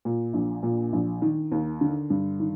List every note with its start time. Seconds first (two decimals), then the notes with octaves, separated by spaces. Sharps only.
0.05 A#2
0.33 A#1
0.63 A#2
0.93 A#1
1.22 D#3
1.52 D#2
1.81 D3
2.10 G2
2.40 D#3